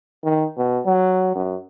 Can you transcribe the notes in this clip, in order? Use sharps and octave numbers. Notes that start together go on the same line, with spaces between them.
D#3
B2
F#3
F#2